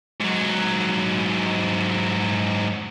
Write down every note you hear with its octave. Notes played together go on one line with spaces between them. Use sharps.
G#2 F#3